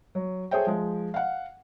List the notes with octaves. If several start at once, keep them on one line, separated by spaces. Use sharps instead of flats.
F#3
G#4 A4 C5 C#5 E5 G5
F3 G#3
F5 F#5